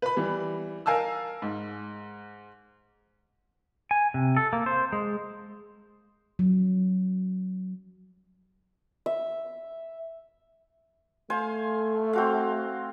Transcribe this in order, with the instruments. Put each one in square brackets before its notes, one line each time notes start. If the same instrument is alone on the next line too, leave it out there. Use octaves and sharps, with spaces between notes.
[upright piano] B4 B5
E3 G3
A#4 F5 G#5 A5 E6
G#2
[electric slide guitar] G#5
C3
A4
A#3
C5
G#3
[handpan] F#3
[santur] E5
[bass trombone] A3 [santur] C5 F5 G#5
[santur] C4 F#4 F5